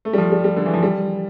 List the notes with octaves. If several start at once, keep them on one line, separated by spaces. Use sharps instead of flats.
A3
G3
F3
G3
G3
D3
E3
F3
G3